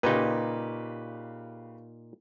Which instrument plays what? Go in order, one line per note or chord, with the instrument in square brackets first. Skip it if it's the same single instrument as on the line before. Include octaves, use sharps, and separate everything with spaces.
[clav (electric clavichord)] A#2 D#4 [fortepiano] C#3 G4 B4